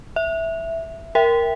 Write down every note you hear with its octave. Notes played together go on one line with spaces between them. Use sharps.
E5
A#4 E5 G5